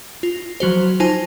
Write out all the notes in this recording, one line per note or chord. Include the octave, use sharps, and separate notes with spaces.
F4
F3 F#3 F#4 C5
D#4 F4 C5 G#5 A5